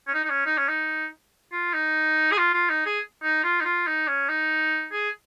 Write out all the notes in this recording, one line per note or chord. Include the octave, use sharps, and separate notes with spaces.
C#4
D#4
D#4
C#4
D#4
C#4
D#4
F4
D#4
G#4
F4
F4
D#4
G#4
D#4
F4
D#4
F4
D#4
C#4
D#4
G#4